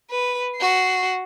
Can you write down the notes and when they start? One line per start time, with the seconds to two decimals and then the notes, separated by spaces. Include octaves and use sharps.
0.11 B4
0.56 F#4 C7